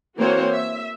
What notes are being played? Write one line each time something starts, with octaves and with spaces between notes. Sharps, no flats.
E3 A#3 C4 F#4 C5 C#5
E5